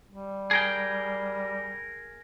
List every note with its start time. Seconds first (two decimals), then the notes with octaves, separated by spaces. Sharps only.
0.08 G3
0.51 G#4 A#4 G5